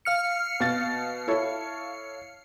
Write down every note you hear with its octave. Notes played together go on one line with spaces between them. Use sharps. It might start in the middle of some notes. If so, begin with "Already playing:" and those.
F5 F6 C#7
B2 A6
E4 A4 C#5